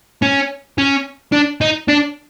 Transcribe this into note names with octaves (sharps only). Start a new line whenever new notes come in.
C#4
C#4
D4
D#4
D4